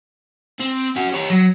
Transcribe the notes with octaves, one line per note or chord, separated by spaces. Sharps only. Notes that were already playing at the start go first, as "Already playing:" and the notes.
C4
C#4 F#4
G4 C#5
F#3